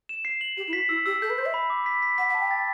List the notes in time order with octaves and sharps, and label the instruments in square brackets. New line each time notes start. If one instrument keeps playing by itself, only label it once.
[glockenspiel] E7
C7
F#7
[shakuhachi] G4 [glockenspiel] E7
[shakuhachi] E4
[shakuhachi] F#4 [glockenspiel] B6
[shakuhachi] E4 [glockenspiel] E6
[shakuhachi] G4 [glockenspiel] E6
[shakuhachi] A4 [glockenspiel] G6
[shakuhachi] B4
[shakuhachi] C5 [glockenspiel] G6
[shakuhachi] E5
[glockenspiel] B5
D6
B6
B6
[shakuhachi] F#5 [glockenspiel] B6
[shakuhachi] F#5
[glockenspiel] A5
[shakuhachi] G5
[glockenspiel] A6